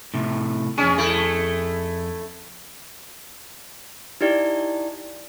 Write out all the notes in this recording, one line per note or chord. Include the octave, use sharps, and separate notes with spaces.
A2 C3
F2 C#4 G#4
A3 E4
D#4 E4 G4 D5